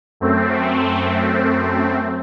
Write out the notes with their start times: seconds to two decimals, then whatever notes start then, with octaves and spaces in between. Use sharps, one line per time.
0.20 F#2 A3 C4